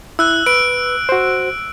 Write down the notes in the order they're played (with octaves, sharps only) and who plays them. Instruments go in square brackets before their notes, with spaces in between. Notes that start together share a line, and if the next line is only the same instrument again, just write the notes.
[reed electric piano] E4 [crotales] E6 F#6
[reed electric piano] B4 [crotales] D7
[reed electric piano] F#4 C5